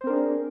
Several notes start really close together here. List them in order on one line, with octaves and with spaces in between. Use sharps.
C5 C4 A#4 D4 G#4